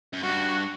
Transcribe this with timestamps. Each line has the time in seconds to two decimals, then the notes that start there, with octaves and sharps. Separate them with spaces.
0.13 F#2
0.23 G2 F#4